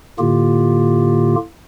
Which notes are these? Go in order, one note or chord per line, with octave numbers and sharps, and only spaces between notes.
A2 D3 A#3 F4 G4